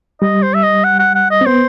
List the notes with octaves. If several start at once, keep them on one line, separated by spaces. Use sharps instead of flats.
G3 D#5
C5
E5
D#5
F#5
F#5
F#5
D#5
C4
B3 C5